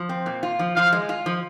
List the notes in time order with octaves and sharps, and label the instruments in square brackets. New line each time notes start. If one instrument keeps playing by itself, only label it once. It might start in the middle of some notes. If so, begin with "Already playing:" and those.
Already playing: [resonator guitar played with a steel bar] F3
C4
A#2
F4
F3
[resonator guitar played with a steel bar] F3 [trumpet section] F5
[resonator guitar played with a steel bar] G#3
F4
F3